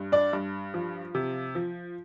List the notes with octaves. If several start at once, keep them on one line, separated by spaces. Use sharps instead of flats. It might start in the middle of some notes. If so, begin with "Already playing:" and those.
Already playing: G2
D4 D5
G2
F3
C3
F3